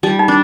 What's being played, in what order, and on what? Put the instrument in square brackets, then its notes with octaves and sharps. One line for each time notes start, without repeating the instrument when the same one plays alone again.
[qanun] G3 [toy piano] D#4
[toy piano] D#4
[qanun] D4